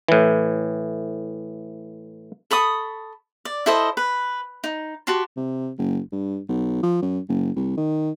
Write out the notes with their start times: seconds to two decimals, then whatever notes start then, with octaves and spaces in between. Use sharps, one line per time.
0.08 A2 E3
2.51 A4 B5 C#6 D#6
3.45 D5
3.66 E4 A4 C5 D#5
3.97 B4
4.64 D#4
5.07 F#4 G4 A5 C6
5.37 C3
5.78 F#1
6.12 G2
6.48 B1
6.83 F3
7.02 F#2
7.29 F#1
7.56 C2
7.77 D#3